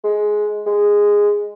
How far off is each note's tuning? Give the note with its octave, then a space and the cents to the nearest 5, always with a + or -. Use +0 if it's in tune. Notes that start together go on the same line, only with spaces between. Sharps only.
G#3 +10
G#3 -10